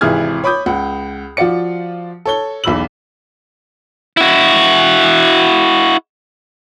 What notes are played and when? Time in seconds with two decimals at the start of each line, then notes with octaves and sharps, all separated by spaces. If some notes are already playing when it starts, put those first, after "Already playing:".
0.01 G#1 C3 E3 G#4 F6 G#6
0.44 C#5 B5 D6 D#6 G6
0.66 C#2 F#5
1.37 F3 F4 F#4 D5 C#7
2.26 A4 C#5 G7
2.64 B1 E2 B5 E6 F#7
4.17 E4 F#4